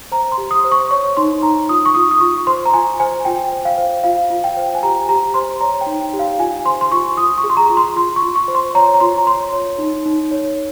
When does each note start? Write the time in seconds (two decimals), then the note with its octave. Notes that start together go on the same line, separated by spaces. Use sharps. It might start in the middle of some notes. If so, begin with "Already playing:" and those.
0.12 C5 A#5
0.32 C6
0.38 G4
0.51 D#6
0.64 C5
0.72 C#6
0.91 C#5 C#6
1.17 D#4 C6
1.43 D#4 A#5
1.69 F4 D#6
1.85 C#6
1.95 F4 D#6
2.11 D#6
2.21 F4 C#6
2.47 C5 C6
2.66 A#5
2.73 F4 G#5
3.00 C5 G#5
3.25 F4 G5
3.52 C5
3.65 F5
3.78 C5
4.03 F4 F5
4.30 F4
4.44 G5
4.57 C5
4.75 G#5
4.83 G4 A#5
5.09 G4 A#5
5.34 C5 C6
5.61 C#5 A#5
5.81 G5
5.86 D#4
6.14 G4
6.19 F5
6.39 F4 G#5
6.65 C5 C6
6.81 C6
6.92 F4 C#6
7.17 F4 D#6
7.38 C#6
7.44 G#4
7.50 C6
7.57 A#5
7.70 F4
7.77 C6
7.96 F4 C6
8.16 C#6
8.23 F4
8.36 C#6
8.48 C5
8.55 C6
8.75 C#5 A#5
8.94 A#5
9.00 F4 C6
9.18 A#5
9.27 C#5 C6
9.53 C#5
9.78 D#4
10.06 D#4
10.32 C#5